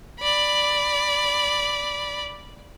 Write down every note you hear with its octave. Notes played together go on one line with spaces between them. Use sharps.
D5 B5